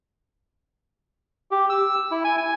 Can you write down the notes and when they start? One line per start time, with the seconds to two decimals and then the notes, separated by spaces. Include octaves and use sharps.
1.51 G4
1.70 E6
2.11 E4
2.24 G#5
2.37 G#5